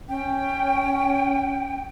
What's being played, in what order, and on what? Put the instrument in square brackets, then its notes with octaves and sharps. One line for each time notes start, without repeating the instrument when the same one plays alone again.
[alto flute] C#4 [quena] G5